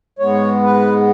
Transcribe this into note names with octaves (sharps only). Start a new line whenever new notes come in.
G#2 G#3 B3 C#5
B4